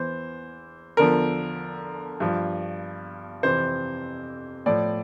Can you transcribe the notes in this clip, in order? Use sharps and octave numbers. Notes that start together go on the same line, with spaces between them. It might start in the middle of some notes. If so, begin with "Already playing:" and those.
Already playing: E2 E3 C5
E2 D3 F3 A#4
G2 F3
F2 C3 E3 C5
A2 F3 D5